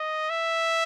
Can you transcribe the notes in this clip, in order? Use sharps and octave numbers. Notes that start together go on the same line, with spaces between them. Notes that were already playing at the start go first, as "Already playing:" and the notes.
Already playing: D#5
E5